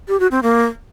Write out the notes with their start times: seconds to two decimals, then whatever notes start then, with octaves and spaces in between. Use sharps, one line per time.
0.08 G4
0.20 F#4
0.31 C4
0.43 A#3